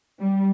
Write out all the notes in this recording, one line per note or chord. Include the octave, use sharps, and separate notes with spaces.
G3